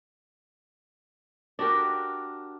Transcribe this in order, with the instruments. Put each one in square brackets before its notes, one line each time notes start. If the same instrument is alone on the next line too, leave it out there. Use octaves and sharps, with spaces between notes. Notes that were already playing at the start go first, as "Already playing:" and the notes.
[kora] D4 F#4 G4 A#4